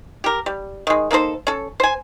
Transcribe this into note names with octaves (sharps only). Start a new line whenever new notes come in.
G4 A#4
G3
D#3 G#3
A#3 D#4 A4 C5
C#4 A4
C5 G#5